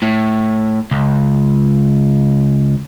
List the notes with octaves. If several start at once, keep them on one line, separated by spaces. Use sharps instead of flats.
A2
C#2